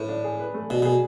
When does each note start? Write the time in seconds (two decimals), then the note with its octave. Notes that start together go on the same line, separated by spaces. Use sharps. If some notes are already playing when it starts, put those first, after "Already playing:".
Already playing: A2 A3 B4
0.09 D4
0.24 G#4
0.40 B4
0.54 A3
0.70 B2 D4
0.82 B2 G#4